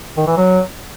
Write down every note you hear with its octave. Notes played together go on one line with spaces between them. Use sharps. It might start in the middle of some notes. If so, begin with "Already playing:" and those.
D#3
E3
F#3